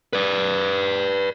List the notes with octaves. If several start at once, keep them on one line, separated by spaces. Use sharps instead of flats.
B4 D5